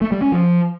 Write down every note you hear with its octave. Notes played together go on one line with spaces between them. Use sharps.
A3
G3
C#4
F3